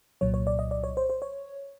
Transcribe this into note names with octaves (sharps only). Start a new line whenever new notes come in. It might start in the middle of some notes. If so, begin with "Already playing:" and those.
C2 A#2 F#3 C#5
C#5
D5
D#5
D5
C#5
C5
C5
C#5